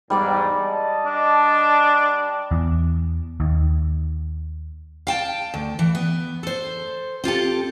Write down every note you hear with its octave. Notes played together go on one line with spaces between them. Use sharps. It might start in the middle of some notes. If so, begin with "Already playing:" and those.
E2 G#2 G3 D5 D6
D#5 A5
D4
E2
D#2
F5 G5 A5
D2
E3
B3
A4 C5
C4 F4 G4 A4